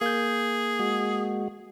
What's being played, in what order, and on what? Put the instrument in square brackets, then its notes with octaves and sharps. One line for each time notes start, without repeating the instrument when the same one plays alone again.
[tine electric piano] A#3 G6 [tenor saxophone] G#4
[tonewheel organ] G#3 F#4